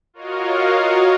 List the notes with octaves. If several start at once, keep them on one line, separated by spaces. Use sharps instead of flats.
F4 F#4 A#4 C#5 D#5 F5